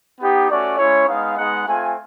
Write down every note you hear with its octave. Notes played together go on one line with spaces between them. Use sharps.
B3 D#4 G4
A3 C#4 F#4 D5
G#3 C#4 E4 C#5
G#3 B3 D#4 F5
G#3 B3 D#4 F#5
A3 C4 F4 G#5